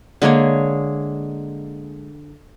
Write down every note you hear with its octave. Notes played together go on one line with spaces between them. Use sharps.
D3 G#3 A#3 C#5